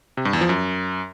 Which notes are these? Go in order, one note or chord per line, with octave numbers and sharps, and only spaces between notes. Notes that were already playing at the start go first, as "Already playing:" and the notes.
C3
G2
E2
F3
F#2